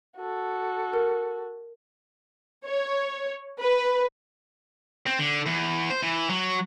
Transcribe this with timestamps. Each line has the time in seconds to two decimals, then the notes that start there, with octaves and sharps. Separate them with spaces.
0.17 F#4 A4
0.93 A#4
2.66 C#5
3.61 B4
5.07 C4
5.19 D3
5.47 E2
5.90 C5
6.03 E3
6.29 F#3